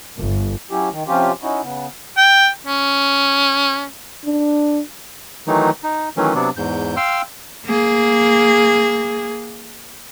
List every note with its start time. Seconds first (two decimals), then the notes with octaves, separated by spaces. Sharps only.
0.17 G1
0.71 F#3 C#4 E4 G4
0.92 D#3
1.08 C3 F3 C#4 F4 G4
1.42 C#4 D#4 E4 F#4
1.63 C#3 B3
2.17 G5
2.66 C#4
4.25 D4
5.47 D#3 E3 F#3 A3 D#4
5.83 D#4
6.17 D#3 E3 F#3 A3 C#4
6.35 C3 F#3 B3 D4
6.57 E2 G#2 G6
6.97 F5 G5 C6 E6 F6
7.65 A#3 G#4